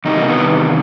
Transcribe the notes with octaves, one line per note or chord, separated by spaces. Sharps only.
E2 C3 D#3 G3 D#4
A#3
B3